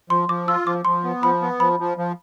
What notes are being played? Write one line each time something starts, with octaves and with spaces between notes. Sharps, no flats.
F3 C6
F3 D6
F4 E6
F3 D6
F3 C6
B3
F3 B5
B3
F3 B5
F3
F3